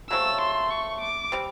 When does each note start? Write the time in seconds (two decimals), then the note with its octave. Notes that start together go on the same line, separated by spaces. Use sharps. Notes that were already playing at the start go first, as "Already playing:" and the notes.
0.10 C#3 F#3 A3 C4 E6
0.41 C6
0.70 C#6
1.01 D6
1.32 G3 C4